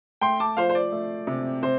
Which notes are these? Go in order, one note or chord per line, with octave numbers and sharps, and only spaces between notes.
A3 G5 C6
A5 D6
F3 C5 F5
C5
D5
A3
C3
C3 C5